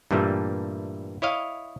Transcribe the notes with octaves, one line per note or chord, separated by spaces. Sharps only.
G2 A#2 E3 G3 A3
E4 C#5 D#5 F5